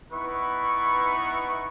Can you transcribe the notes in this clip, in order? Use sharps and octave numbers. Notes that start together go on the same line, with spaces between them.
B3 D#4 E4 B4 C#6